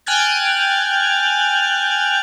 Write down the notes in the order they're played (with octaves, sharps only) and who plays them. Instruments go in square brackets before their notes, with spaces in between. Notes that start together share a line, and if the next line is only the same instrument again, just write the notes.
[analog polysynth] G5 G#5 F6 F#6 G#6 A6